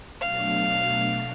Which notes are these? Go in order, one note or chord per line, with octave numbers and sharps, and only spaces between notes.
B2 F#3 A3 D4 F5